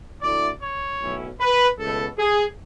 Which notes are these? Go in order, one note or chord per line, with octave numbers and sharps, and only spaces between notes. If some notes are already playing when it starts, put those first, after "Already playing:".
D2 D3 A3 E4 D5
C#5
B1 A2 F#3 C#4 E4
B4
C#2 B2 A3 A4
G#4